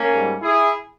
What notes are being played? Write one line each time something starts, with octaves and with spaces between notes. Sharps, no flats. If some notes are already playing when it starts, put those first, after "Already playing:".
Already playing: A#3 C#4
G#2 G3
E4 G#4